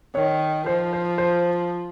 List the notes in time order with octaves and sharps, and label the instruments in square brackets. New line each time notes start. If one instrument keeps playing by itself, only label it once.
[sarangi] D#3 [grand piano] C#5
[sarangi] F3 [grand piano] C5
[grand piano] C5
C5